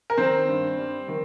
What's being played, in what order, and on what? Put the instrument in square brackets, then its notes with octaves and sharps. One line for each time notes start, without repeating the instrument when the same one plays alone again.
[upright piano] A#4
D#3 C4 C5
G2
G3
D#3